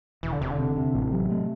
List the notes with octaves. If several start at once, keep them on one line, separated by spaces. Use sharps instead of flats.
E1 E3
D3
E1 C3
D3
C3
C3
A1 A2
C3 F#3
A3